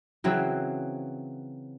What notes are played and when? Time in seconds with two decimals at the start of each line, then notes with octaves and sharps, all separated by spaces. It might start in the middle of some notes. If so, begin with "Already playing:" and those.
0.24 C#3 E3 F#3 C4